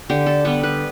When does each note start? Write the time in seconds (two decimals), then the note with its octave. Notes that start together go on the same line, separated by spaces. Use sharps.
0.10 D3 G4
0.26 A4
0.45 G3 B3 B4
0.63 B4